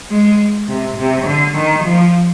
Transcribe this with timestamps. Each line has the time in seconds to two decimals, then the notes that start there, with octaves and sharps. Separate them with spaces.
0.11 G#3
0.68 C3
0.97 C3
1.26 D3
1.55 D#3
1.84 F3